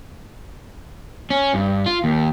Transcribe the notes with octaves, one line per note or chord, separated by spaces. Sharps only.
C#4
G2
F4
D#2